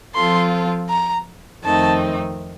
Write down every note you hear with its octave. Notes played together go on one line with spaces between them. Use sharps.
F3 C4 F4 A4 C6
A#5
F2 D#3 A3 C4 D#4 A5